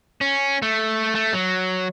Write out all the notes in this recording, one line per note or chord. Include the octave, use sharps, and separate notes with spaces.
C#4
A3
A3
F#3